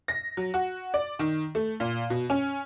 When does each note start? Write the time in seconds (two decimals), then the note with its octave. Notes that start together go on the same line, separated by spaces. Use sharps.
0.08 A#6
0.37 F#3
0.54 F#4
0.94 D5
1.19 D#3
1.55 A3
1.80 A#2
2.10 B2
2.30 C#4